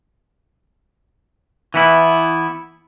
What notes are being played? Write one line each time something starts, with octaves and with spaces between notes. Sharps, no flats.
E3 B3 E4